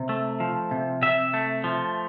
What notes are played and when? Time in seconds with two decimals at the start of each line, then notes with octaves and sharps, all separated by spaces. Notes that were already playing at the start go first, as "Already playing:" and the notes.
Already playing: C3
0.09 A3
0.40 F3
0.71 C3
1.02 C3 E5
1.34 A3
1.64 F3